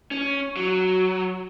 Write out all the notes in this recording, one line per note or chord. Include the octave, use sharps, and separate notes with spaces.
C#4
F#3